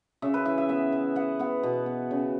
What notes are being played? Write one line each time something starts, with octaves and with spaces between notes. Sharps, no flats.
C#3 E5
B4
E3 E5
E5
B3 E5
E3
B3 F#5
B3 F#5
B2
B3
C#3